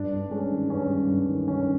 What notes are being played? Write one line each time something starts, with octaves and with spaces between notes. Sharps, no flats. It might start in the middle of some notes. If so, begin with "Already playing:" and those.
Already playing: G2 D4
G2
G#3 C#4
D#3
G2 C#4
G2
G2
D#3
D#3 C#4